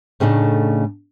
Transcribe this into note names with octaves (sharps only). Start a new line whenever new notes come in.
A2 C#3 A3 D4 D#4